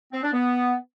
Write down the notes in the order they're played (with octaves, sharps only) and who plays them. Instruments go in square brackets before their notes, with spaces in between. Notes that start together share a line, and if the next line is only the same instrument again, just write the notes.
[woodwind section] C4
D4
B3